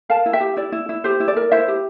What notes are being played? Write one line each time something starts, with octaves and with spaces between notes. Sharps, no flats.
A#4 F5 A5
E4
E5 G5
G4
E4 D5
E4
E4
G4 C5
E4
D5
A#4
E4 C5 E5
G4